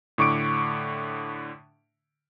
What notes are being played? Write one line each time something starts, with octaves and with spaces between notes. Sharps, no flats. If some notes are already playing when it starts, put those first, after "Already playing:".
A2 D3 C#6 D6 D7